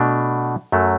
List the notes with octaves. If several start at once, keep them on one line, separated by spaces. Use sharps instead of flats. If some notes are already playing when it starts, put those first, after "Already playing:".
Already playing: B2 A3 D4
F#2 F#3 A3